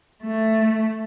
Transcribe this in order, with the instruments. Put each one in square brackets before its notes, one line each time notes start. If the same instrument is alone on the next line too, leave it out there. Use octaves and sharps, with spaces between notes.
[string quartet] A3